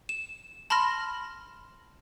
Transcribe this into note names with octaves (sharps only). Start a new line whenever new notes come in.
E7
A5 B5 C6 F6 A#6